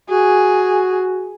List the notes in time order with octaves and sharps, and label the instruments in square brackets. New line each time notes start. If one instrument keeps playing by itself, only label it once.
[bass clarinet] F#4 [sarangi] G#4